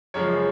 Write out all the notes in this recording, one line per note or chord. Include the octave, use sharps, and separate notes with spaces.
F#2 C#3 F3 G#3 C#5